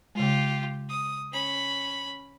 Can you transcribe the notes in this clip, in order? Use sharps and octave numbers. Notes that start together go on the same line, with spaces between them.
C#3 G#3 F4 G4
D#6
C#4 B5